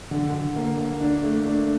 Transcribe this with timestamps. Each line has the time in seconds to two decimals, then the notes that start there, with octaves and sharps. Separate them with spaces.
0.11 D3
0.34 D3
0.56 A#3
0.78 A#3
1.01 D4
1.23 A3
1.45 D4